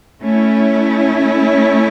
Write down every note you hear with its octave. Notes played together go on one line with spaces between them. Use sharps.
A3 C#4 E4